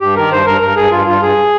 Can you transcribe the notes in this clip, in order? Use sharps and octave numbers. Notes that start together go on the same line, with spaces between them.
G2 G4
D#3 A#4
G2 C5
G2 A#4
G2 A#4
G2 G#4
G2 F4
G2 F4
G2 G#4